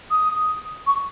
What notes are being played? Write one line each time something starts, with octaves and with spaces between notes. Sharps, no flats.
D#6
C#6